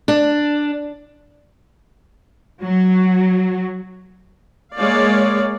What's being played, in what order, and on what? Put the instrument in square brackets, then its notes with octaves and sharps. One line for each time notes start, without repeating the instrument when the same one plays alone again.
[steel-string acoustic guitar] D4
[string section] F#3
[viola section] G#3 A#3 C#5 D5 F5